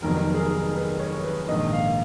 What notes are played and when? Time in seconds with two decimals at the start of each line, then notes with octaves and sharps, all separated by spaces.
0.02 F1 F2 D#3 F#3 B3 A#4
0.34 G#4
0.39 A#4
0.75 B4
0.99 C#5
1.24 B4
1.48 A#1 G#2 D#3 A#3 D#5
1.72 F5